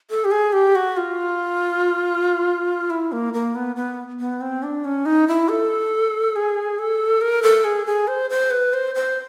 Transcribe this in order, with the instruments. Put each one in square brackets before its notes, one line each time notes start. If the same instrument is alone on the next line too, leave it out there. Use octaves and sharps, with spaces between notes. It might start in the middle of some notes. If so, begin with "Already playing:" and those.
[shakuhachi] A4
G4
G#4
G4
F#4
F4
E4
A#3
A#3
B3
B3
B3
C4
D4
C#4
D#4
E4
A4
G#4
A4
A#4
A4
G#4
G#4
C5
C5
B4
C5
C5